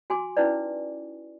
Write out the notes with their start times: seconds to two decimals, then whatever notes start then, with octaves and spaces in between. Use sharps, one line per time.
0.10 F#4 G#5 C6 D6
0.37 C#4 D#4 E4 B4 D5